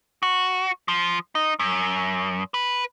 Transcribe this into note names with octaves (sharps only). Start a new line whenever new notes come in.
F#4
F3
D#4
F#2
B4